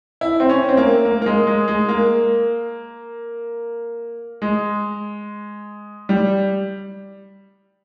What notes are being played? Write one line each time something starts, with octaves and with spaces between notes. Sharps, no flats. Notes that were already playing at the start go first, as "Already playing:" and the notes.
E4
C4
C#4
C4
A#3
A#3
A#3
G#3
G#3
G#3
A#3
G#3
G3